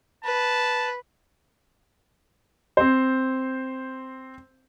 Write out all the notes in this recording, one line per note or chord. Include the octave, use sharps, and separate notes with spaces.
B4 A5
C4 C5